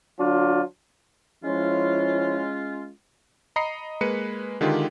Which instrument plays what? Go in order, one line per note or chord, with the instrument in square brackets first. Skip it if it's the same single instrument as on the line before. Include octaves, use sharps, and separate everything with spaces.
[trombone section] D3 F#3 D4 F4
[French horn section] F3 E4 C#5 [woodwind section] G#3 C#4 F4
[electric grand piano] D#5 A#5 B5 D#6 C7 C#7
G#3 A#3 B4 C#7 D#7
D3 D#3 G#3 F4 G4